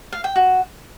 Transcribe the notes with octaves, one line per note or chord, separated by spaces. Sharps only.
F5
G5
F#4